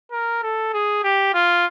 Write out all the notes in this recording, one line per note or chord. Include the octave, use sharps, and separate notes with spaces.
A#4
A4
G#4
G4
F4